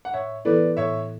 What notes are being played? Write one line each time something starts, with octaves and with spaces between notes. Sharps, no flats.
F#5
A2 C#5 E5
E3 B3 E4 A4 B4 D5
A2 C#5 E5